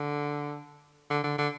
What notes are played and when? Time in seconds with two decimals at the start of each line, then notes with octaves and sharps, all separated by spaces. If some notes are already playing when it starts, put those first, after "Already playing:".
Already playing: D3
1.10 D3
1.24 D3
1.38 D3